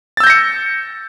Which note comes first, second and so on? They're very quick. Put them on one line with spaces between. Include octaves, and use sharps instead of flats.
A6 E6 G6 A#6 C#7